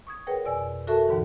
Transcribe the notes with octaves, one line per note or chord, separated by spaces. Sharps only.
C#6 D#6 G#6
G#4 A#4 B4 C#5 F#5 G5
F2 B2 D5 G#5 E6
F#4 A4 A#4 E5 A5 C#6
D#2 G#2 D3 E3